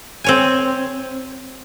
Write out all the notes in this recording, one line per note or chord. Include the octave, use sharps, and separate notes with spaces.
C4 C#5 G#5